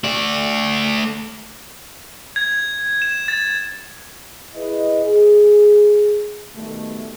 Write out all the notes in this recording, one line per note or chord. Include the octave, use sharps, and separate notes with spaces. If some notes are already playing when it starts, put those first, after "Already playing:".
A3 D5
G#6
E7
A6
E4 G#4 B4 D#5
G#4
B2 D#3 G3 A3